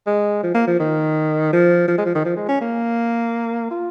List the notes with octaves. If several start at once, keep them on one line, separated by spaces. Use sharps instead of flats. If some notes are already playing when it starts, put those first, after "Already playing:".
G#3
F3
A#3
F3
D#3
F3
F3
G#3
F3
D#3
F3
G#3
C#4
A#3
F4